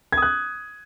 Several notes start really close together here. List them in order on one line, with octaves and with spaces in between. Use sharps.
G#6 D#6 F#6